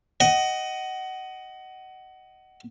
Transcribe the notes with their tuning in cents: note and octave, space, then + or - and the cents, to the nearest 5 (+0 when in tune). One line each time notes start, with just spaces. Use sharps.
D#5 +0 F#5 +25